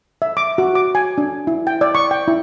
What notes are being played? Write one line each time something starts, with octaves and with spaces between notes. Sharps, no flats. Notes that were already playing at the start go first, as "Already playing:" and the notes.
E5
D6
F#4
D6
G#5
D4
E4
G5
D5
C#6
G5
E4